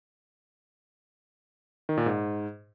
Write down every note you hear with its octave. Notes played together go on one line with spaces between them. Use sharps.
D#3
A#2
G#2